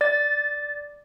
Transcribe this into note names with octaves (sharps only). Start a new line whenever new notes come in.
D5 A6